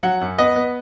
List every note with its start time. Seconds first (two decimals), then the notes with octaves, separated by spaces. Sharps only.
0.03 F#3 F#5
0.21 F#2
0.38 B3 D#5
0.56 B3